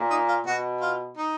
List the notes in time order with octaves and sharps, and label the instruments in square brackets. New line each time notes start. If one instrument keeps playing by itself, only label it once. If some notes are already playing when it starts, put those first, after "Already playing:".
Already playing: [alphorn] A#2
[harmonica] D#4
F4
[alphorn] B2 [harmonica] F#4
[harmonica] F4
D#4